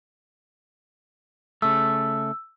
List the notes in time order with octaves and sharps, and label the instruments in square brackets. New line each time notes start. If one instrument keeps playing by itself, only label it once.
[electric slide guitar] C#3 A3 [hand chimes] E6